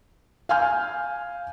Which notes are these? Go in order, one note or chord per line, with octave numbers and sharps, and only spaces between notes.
F5 G#5 F6 G6